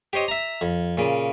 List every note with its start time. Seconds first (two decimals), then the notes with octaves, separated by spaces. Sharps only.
0.13 G4 C5 C#5 D#5
0.28 E5 A#5
0.61 F2
0.97 A#2 C#3